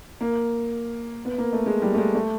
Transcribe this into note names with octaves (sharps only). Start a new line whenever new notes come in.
A#3
B3
A#3
A3
G#3
G3
A3
G#3
A3